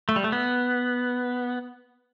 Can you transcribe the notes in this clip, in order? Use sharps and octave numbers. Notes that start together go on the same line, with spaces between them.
A3
G3
A3
B3